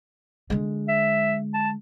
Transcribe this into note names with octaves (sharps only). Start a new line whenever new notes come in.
D3 G#3
E5
A5